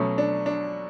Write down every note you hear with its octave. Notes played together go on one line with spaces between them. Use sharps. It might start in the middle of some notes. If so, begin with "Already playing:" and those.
Already playing: B2 F#3 A3 C#4
D4
D4